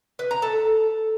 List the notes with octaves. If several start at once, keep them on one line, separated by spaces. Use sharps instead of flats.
B4
A#5
A4